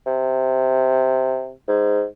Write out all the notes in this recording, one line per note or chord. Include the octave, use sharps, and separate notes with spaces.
C3
G#2